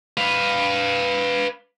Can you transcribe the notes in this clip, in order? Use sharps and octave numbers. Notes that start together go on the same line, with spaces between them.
B4 F5